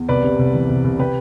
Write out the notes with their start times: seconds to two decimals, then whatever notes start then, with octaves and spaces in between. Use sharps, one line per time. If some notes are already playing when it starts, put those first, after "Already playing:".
Already playing: E2
0.09 C2 B4 D5
0.24 C3
0.39 C2
0.54 E3
0.69 C2
0.84 C2
0.99 C3 G4 B4